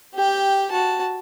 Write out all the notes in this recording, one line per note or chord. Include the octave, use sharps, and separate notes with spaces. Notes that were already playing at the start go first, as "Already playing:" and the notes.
G4 G5
F#4 A5